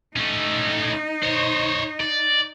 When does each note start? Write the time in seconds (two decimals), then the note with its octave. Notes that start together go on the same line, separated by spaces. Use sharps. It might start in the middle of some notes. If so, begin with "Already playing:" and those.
0.16 A3 C#4 D#4
1.23 C5 C#5
2.01 D5